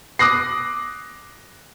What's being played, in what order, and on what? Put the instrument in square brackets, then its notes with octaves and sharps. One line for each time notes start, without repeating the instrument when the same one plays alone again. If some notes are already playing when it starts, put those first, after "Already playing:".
[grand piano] D6 D#6 F#6 A#6 C7